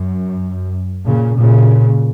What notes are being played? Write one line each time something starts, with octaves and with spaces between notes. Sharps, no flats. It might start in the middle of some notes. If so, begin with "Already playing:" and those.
Already playing: F#2
A#2 C#3
A#2 C#3